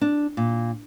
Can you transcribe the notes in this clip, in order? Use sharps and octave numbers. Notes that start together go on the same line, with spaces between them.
D4
A#2